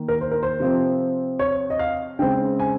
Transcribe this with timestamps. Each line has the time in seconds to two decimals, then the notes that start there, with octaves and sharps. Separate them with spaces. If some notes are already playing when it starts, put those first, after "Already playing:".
Already playing: D#3 A#3
0.08 A#4
0.21 C5
0.31 A#4
0.43 C5
0.60 C3 F3 C4
1.39 C#5
1.70 D#5
1.79 F5
2.19 C#3 G#3 C4 G5
2.60 G#5